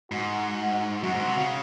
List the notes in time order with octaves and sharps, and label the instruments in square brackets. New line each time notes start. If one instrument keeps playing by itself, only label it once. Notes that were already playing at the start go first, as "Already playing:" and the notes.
[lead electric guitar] G#2 [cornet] F#4
[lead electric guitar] F#2 [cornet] F#4
[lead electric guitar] G#2
C3
C#3